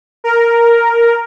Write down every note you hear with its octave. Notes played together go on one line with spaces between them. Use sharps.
A#4